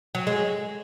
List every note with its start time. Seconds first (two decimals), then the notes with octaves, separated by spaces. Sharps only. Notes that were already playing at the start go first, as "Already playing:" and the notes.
0.15 F#3
0.27 G#3